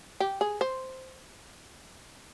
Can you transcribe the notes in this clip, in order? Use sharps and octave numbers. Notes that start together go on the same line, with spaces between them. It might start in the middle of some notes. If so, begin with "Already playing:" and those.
G4
G#4
C5